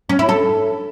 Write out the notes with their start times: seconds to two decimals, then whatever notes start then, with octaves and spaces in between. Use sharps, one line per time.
0.09 C#4
0.19 E4
0.29 A4